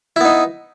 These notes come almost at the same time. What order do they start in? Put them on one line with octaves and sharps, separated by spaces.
E4 B3 D#4